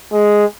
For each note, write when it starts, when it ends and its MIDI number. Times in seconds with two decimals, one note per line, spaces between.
0.12 0.45 56